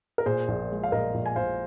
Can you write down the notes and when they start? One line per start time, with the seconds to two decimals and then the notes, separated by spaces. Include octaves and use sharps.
0.18 A#4
0.26 A#2 G#4 C5
0.48 A#1
0.70 G#3
0.83 F5
0.92 A#1 A#4 D#5
1.14 A#1
1.26 G#5
1.36 A#1 C5 F5